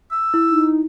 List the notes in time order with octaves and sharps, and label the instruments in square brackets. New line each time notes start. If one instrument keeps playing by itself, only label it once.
[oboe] E6
[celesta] E4
[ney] D#4